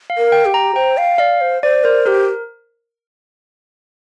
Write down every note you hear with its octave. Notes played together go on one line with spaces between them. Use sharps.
F5
A#4
G5
G4
A#5
C5 G5
F5
D5 F5
C5
C5 D5
A#4 C5
G4 A#4